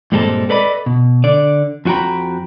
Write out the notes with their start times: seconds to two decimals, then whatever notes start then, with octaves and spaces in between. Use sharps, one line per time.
0.12 G2 A#2 G3 G#3 C4 A4
0.49 A4 B4 D5 D#5 B5
0.86 B2
1.24 D3 D5
1.85 F2 F4 F#4 G5 A#5 B5